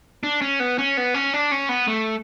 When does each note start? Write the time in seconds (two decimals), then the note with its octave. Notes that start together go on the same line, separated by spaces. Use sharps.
0.23 D4
0.42 C#4
0.60 B3
0.78 C#4
0.97 B3
1.14 C#4
1.34 D4
1.51 C#4
1.69 B3
1.88 A3